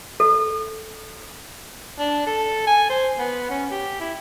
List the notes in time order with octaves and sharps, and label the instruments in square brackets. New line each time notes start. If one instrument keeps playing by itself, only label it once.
[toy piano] A4
[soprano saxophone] D4
A4
G#5
C5
B3
C#4
G4
E4